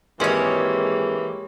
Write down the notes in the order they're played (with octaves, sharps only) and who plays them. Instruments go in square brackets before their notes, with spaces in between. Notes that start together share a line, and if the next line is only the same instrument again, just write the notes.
[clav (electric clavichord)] G#1 C#4 [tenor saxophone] E3 [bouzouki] G#3 C#5 [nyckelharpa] A#3 G4